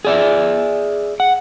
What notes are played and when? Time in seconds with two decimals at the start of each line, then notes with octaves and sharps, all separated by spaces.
0.05 G#4 D5 E5
1.20 F#5